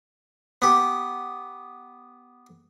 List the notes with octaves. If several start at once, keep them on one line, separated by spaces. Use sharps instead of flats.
B3 G4